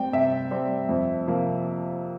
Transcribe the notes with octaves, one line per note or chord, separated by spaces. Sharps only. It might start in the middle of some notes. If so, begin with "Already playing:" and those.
Already playing: G3 C4 G5
C3 E5
G3 C4
F2
C3 F3 A#3